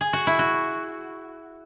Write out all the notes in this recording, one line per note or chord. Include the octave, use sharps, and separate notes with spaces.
G#4
F#4
E4
F#4